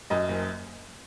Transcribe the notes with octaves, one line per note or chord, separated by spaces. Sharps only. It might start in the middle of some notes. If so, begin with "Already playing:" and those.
F#2 D#5
F#1